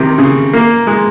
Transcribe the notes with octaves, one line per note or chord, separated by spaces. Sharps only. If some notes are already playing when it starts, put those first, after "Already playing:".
Already playing: C3 D#3
C#3
A#3
G#3